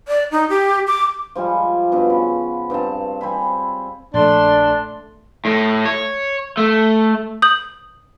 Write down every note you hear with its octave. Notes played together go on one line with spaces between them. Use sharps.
D5
D#4
G4
D6
F3 G3 G#3 G#5
G2 B2 B3
C#3
G2 C4 F5 A5
G3 C4 G#5 B5
A#1 A3 D4 D5 C6
A2
C#5
A3
D#6 G6 F#7